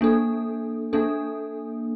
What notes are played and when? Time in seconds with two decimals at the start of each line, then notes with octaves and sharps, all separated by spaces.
0.01 A#3 D4 A4
0.93 A#3 D4 A4